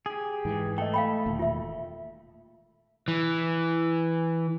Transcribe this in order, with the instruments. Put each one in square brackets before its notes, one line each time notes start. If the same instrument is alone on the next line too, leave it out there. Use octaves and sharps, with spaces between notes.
[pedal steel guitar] G4 G#4
[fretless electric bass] G#2 E3
[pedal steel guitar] A3 [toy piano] D#5 G5
[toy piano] F5 G5 B5
[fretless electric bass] E1 A#2 D#3
[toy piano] F4 E5
[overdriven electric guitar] E3